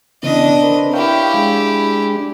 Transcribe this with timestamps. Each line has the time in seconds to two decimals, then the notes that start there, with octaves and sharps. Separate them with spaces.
0.23 C#3 E3 B3 D4 D#5
0.62 C4 A#4 B4
0.93 E4 G4 C#5 F5 G5
1.34 G#3 D4